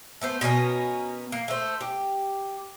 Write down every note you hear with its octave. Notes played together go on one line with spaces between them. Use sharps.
A3 B3 C5
B2 B3 C#4 A#4
A#3
A3 C5
G4